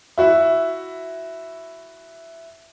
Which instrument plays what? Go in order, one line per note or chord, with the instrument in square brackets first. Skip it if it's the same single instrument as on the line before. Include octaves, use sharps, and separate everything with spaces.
[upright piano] E4 F#4 E5